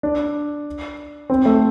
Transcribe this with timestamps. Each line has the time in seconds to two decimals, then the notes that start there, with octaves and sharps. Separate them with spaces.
0.03 D4
1.30 C4
1.46 A3